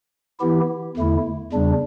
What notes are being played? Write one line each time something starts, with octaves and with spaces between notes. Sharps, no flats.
E3 B3 E4 G4
E2 D3 A3 E4
E2 C#3 G3 D4